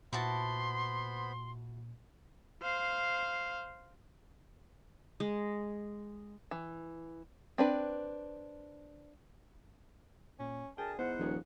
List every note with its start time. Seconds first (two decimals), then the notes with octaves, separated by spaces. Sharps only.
0.13 A#2 B3 E4 F#4 C5 A5 B5 C6
2.62 C5 F5
5.20 G#3
6.51 E3
7.58 C4 D4 B4
10.40 A#2 C#4
10.78 D2 G#4 A#4 G5 A5
10.99 G#2 B3 E4 C5 F#5
11.19 D#1 F3 G#4 C#5